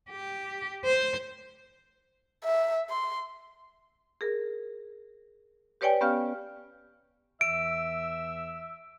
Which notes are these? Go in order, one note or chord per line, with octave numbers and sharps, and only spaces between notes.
G4
C5
E5
C6
G#4 A#4
G4 B4 C#5 D5 G5 G#5
B3 C#4 G4 F5 F6
E2 E3 E5 E6 D7